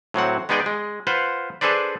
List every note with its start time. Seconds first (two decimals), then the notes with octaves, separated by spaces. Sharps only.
0.14 A2 F#3 C4 F#5
0.49 G#3 B3 D#4 G#4 D5 G5
0.66 G#3
1.07 F4 B4 C5 F#5
1.61 D4 G#4 A4 B4 C5 D5